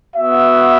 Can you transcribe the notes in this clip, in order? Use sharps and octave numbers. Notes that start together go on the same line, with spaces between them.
B3 F#4 E5